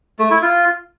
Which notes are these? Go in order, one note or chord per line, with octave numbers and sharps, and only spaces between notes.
A3
E4
F4